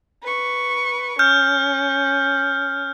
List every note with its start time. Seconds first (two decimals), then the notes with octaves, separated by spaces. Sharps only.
0.23 B4 C#6
1.19 C#4 F6 G6